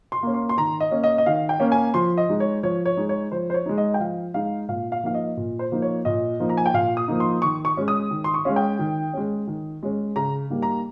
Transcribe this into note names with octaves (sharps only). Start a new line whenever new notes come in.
C6
A#3 C#4
C6
C6
D#3 A#5
D#5
A#3 C#4
D#5
D#5
D#3 F5
G5
A#3 C#4
G#5
F3 C6
D#5
G#3 D#4
C#5
F3 C#5
C#5
G#3 D#4
C#5
F3 C5
C5
C#5
G#3 D#4
D#5
G5
F3 F5
G#3 D#4 F5
A#2 F5
F5
F3 A#3 D#4 F5
D#5
A#2
C5
F3 A#3 D#4
C#5
A#2 D#5
F3 A#3 D#4
A#5
G#5
G5
A#2 F5
D#6
F3 A#3 D#4
C6
D#3 C#6
C#6
G#3 C#4
D#6
D#3
C6
C#6
G#3 C#4 F5
G5
D#3
G#3 C#4
D#3
G#3 C#4
C#3 A#5
G3 A#3 D#4
A#5